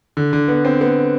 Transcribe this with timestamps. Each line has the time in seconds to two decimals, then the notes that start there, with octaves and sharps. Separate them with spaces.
0.17 D3
0.33 D3
0.48 B3
0.65 C4
0.81 B3